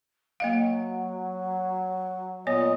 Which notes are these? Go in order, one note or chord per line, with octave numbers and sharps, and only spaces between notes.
F#3 A#3 D#5 F5
A#2 B3 C#5 D#5